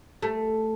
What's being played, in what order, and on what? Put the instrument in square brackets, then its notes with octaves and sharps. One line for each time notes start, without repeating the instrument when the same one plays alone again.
[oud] A3